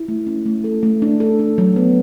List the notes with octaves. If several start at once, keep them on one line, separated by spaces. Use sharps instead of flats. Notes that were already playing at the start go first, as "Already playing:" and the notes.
Already playing: E4
A3
C#4
A3
A4
A3
D4
A4
D4
F#3
B3